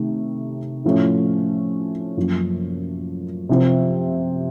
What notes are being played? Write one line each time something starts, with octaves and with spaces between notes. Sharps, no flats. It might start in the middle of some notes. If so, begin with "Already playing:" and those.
Already playing: C3 D#3 A3 D#4
A2 F3 A3 C#4
F#2 F3 A#3
C3 F3 C4